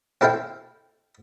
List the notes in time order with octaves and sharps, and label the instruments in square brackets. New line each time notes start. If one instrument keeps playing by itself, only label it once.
[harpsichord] C4 E4 A4 F5 G5